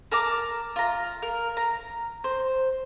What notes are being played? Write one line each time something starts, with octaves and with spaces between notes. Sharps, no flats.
A#4 A5 A#5 D6
F4 A#5
A#4
A#5
C5